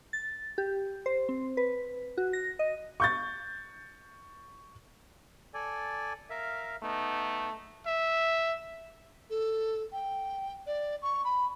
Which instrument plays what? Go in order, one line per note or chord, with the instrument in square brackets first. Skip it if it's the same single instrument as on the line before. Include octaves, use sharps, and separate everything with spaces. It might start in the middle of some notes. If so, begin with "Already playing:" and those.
[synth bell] A6
G4
C5
C4
B4
F#4
A#6
D#5
[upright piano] C#6 G6 A6
[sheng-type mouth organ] A4 D5 G#5
A#4 E5 F5
[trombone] A3 [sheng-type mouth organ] B3 D#4
[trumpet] E5
[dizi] A4
G5
D5
C#6
B5